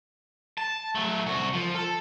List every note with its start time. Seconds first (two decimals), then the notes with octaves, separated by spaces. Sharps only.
0.58 A5
0.95 F#3 A3
1.26 C2 F#4
1.53 F3
1.75 A4